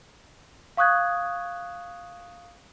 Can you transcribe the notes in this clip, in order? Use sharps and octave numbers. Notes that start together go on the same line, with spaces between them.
F5 C#6 D#6 F#6 G#6